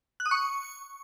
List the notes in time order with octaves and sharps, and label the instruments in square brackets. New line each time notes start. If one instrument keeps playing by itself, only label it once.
[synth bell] F#6
D#6
C#6